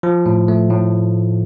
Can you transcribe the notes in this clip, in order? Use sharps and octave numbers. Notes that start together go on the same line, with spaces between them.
F3
A2
A3
A2